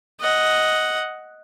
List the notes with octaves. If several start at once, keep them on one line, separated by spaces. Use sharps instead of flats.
D#5 F#5